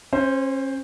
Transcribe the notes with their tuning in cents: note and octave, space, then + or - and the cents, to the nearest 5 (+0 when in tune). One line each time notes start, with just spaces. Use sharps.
C#4 -35 C5 +0